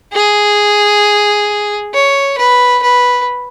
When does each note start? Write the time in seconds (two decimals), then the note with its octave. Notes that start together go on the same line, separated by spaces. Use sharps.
0.13 G#4
1.93 C#5
2.38 B4
2.83 B4